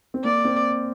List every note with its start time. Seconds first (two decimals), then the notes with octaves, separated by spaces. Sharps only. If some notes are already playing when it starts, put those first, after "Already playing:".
0.14 C4
0.24 A#3 D5
0.45 C4